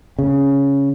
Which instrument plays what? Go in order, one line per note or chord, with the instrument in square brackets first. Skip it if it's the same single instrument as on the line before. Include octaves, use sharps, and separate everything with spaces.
[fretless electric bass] C#3